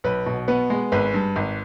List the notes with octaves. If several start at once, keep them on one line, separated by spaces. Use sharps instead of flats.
B1 B4
B2
B3 B4
G#3
G#1 B4
G2
G#1